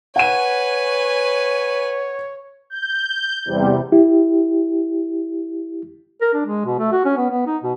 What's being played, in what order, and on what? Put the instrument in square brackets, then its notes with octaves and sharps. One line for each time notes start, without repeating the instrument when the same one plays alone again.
[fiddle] B4 G#5 [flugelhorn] C#5 [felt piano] F#5 D#7
[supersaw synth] G6
E2 C3 G3
[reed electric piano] E4 G4
[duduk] A#4
D4
G#3
B2
A3
F#4
C#4
B3
B3
D#4
B2